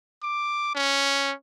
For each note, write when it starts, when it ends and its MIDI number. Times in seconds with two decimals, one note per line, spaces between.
0.23 0.74 86
0.75 1.33 61